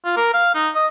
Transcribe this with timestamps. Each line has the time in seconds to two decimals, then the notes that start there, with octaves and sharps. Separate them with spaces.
0.05 F4
0.17 A#4
0.34 F5
0.55 D#4
0.75 D#5